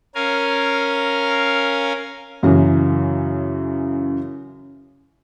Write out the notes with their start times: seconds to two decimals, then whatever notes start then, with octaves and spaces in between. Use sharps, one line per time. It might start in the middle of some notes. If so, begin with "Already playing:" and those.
0.15 C#4 A#4 F5 G#5
2.43 F#2 C#3 E3